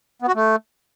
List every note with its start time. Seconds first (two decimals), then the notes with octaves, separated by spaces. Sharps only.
0.22 B3
0.28 F#4
0.35 A3